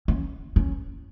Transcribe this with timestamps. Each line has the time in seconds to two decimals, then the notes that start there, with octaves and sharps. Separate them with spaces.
0.08 C#4
0.56 C#4